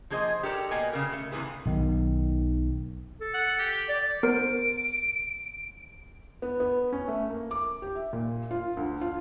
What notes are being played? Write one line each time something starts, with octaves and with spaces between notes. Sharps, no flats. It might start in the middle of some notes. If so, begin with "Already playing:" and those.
F3 A#3 G#4 C5 D#5
G4 A4 A#4 D5
B2 A#3 D#5 G5 G#5
C#3 A#4
A3
C3 E3 F#3 A#3 G#4 B4
B1 D#3
A4
F#5
G4
D5
B3 A#4 C5 D7
B3
B3
C#4
A3
A#3
D6
G4
E5
A#2
F4
D2
F4